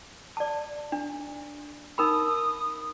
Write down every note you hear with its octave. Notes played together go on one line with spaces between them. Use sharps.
D5 A5
D4
D#4 A#4 B5 D#6